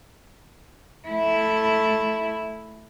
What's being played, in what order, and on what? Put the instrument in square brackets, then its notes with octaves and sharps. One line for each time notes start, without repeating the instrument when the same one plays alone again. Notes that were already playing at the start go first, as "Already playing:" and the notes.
[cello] A3 E4